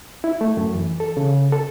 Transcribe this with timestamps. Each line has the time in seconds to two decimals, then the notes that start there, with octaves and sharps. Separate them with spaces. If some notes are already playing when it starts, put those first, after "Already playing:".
0.24 E4
0.41 A3
0.57 F#2
0.75 E3
1.00 A4
1.17 C#3
1.52 A4